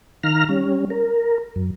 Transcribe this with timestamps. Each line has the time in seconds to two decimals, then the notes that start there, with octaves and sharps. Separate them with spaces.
0.23 D#3 F5 A#5 F6
0.49 G3 C#4
0.90 A#4
1.56 F#2